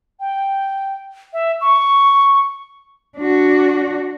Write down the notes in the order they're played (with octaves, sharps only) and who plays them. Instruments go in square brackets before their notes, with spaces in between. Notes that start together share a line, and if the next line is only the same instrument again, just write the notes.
[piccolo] G5
E5
C#6
[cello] D4 F#4